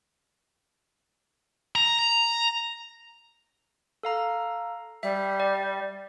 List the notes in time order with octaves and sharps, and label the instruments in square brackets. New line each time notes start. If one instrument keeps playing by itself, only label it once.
[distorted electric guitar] A#5
[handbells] A4 F5 A#5
[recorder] G3 [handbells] E5
[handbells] D5